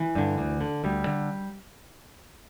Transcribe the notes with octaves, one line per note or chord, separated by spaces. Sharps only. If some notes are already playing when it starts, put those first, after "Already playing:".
Already playing: E3
G2 D3
D2
D3
D2 G3
D3